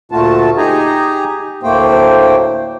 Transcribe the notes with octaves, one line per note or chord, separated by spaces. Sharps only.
D2 A#2 A3 F4 F#4 A5
D#4 G4 G#4 G#5 A#5
D2 A2 A3 A#3 C5 G5